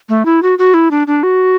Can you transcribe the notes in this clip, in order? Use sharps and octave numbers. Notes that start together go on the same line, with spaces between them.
A3
E4
F#4
F#4
E4
D4
D4
F#4